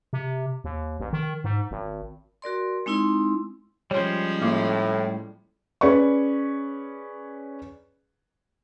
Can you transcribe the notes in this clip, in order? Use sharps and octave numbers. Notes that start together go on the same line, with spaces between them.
C3
D#2
A1
D#3
G#2
G#1
F#4 A#4 D5 C6
G#3 C4 D#4 E4 C6
F3 G3 G#3 C#4 C5 C#5
A2 A#3 D6
C#4 G#4 B4 D5 C#6